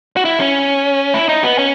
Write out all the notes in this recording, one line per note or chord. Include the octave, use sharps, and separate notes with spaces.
F#4
E4
C#4
E4
D#4
B3
C#4